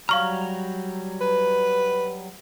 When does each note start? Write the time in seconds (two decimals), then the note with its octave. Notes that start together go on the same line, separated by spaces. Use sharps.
0.09 F#3 G3 F5 A#5 C#6 F6
1.21 B4